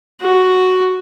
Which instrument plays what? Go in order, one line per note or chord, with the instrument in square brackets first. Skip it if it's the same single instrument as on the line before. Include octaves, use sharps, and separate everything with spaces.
[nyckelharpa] F#4